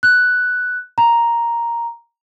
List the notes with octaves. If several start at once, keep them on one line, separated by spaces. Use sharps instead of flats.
F#6
A#5